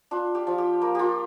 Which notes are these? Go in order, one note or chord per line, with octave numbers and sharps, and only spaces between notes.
D4 F4
G4
F3
G4
A#3
F4 G4